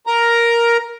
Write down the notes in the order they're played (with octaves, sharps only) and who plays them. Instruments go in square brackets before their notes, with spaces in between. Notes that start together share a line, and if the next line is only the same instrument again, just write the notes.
[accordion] A#4 A#5